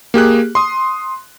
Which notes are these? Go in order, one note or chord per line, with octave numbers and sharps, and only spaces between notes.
A#3 G4 G#4 F#6
C6 D#6